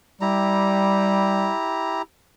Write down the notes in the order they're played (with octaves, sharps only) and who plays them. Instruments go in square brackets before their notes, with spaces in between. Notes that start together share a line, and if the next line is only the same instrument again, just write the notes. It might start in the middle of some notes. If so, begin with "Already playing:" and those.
[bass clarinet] G3 [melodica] E4 G4 A#5